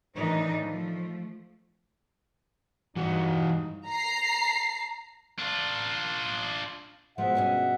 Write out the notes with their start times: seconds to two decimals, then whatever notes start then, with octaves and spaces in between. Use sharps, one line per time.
0.16 A2 D#3 E3 D4 D#4
0.61 F3 A3
2.96 G2 E3 D#4 F#4
3.90 A#5 C7
5.39 D4 F4
7.18 B2 F3 G#3 B3 E5 F#5
7.35 G2 C#4 G#4